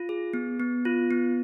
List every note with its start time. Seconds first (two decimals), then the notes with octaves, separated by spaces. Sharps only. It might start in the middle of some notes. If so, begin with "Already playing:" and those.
Already playing: F4
0.09 G#4
0.34 B3
0.60 B3
0.85 F4
1.11 B3